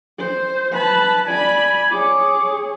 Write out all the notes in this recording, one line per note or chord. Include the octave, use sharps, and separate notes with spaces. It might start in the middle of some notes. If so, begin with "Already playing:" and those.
C5
B4 A5 B5
D5 G#5 B5
G#4 C#5 D6